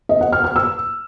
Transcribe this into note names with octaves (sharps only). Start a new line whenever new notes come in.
D#5
F#5
F6
F6
E6